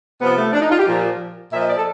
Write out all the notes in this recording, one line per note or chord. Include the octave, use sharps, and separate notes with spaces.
C3 F3 B3
A3
D4
D#4
F4
G4
A#2 F3
A#2 F3 E5
D#5
D5
A4